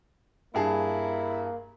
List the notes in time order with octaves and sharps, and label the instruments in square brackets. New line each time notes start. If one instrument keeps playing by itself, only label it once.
[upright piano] G2 G#4 A5 [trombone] A#3 [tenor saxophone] E4